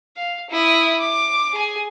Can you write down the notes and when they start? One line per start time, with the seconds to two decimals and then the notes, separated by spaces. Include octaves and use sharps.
0.17 F5
0.50 E4 D#6
1.00 D6
1.53 G#4 G#5